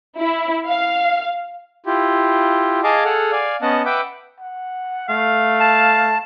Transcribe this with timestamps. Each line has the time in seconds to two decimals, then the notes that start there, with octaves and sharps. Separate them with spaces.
0.18 E4
0.67 F5
1.86 E4 F4 G4
2.84 G#4 D#5 F5 G#5 A5 D6
3.05 G#4 A4 F#5 F6
3.32 D5 F5 G#5
3.62 B3 C#4 D#5 F#5 A5
3.85 B4 E5 F#5 G5 D6
4.40 F#5
5.09 A3 F5
5.60 A5